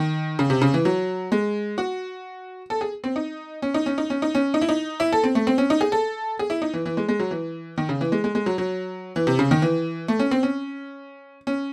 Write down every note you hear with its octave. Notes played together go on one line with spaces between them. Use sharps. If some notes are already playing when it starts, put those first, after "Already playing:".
Already playing: D#3
C#3
C3
C#3
E3
F#3
G#3
F#4
A4
G#4
C4
D#4
C#4
D#4
C#4
D#4
C#4
D#4
C#4
D#4
E4
D#4
E4
A4
C4
A3
C4
C#4
D#4
G#4
A4
G#4
E4
D#4
E3
E3
G#3
G#3
F#3
E3
D#3
C#3
E3
G#3
G#3
G#3
F#3
F#3
E3
C3
C#3
D#3
E3
A3
C#4
C4
C#4
C#4